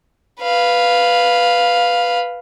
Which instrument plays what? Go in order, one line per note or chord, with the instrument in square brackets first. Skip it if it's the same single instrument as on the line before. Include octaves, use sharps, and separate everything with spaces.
[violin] B4 F5